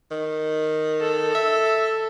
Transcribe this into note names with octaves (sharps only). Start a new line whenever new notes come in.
D#3
A4
E5